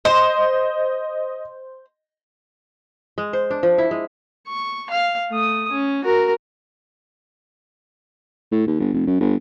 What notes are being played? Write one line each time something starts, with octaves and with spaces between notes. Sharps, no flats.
C5 D#5
G#3
C5
D4
F3
E4
G#3
C#6
F5
A3 D#6
C#4
F#4 A#4
A2
D#2
G1
F1
F#2
G1